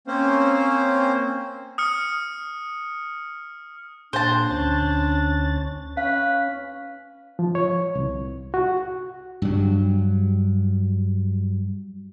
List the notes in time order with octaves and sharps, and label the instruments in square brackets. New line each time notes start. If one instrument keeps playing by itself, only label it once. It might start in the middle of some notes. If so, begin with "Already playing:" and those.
[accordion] A#3 C4 C#4 C5
[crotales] D#6 F6 C#7
[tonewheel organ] A#2 [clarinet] D4 [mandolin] C5 A5
[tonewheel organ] D2 C#4 A6
[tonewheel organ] C#4 [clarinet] B4 [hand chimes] F5
[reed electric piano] F3
C#5
C2
F#4
[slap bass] G2 F#3